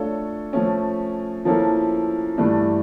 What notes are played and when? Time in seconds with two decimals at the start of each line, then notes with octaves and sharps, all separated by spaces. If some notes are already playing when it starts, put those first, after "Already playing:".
Already playing: A3 D4 F4 A4 C#5
0.53 F3 A3 C#4
1.45 F3 A#3 C#4 E4 A4
2.38 G2 E3 A3 D4